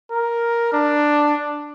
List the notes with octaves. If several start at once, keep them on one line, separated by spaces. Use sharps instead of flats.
A#4
D4